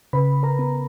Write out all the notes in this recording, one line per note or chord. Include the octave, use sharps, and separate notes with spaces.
C#3 B4 B5
A#4 A#5
B3